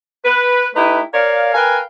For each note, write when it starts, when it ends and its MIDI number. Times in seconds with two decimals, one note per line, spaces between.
0.24 0.66 71
0.75 1.01 57
0.75 1.01 63
0.75 1.01 64
0.75 1.01 67
0.75 1.01 71
1.13 1.51 70
1.13 1.51 73
1.13 1.51 74
1.13 1.51 77
1.54 1.79 70
1.54 1.79 71
1.54 1.79 77
1.54 1.79 79
1.54 1.79 80